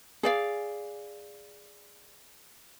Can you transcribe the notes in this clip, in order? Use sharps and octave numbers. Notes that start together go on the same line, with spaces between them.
G#4 D5 F5